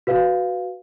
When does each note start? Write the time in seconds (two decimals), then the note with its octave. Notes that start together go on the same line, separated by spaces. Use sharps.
0.07 F#4 B4 F5